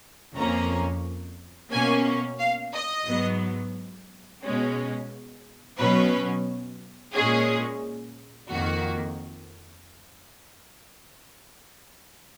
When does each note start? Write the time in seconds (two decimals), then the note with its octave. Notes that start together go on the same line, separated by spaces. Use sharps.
0.36 F2 F3 A#3 C#4 A#5
1.72 B2 A#3 C#4 G#5
2.39 F5
2.74 D#5
3.07 G#2 F#3 B3
4.43 B2 G#3 C#4
5.78 B2 F#3 C#4 B4
7.14 A#2 G#3 C#4 G#4
8.49 F2 D#3 A#3 F#4